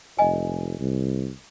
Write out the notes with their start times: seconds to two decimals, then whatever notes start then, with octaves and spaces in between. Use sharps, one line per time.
0.19 F1 D#5 G#5
0.79 C2